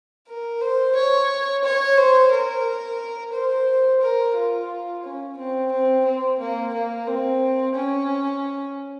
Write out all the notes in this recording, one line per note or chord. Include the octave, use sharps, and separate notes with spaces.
A#4
C5
C#5
C#5
C5
A#4
C5
A#4
F4
C#4
C4
C4
C4
A#3
A#3
C4
C#4